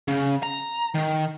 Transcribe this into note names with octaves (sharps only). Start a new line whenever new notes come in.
C#3
A#5
D#3